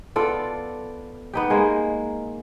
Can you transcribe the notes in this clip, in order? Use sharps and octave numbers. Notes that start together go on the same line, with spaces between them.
B3 F4 A4 D5
B3 D#4 G4
G#3 A#3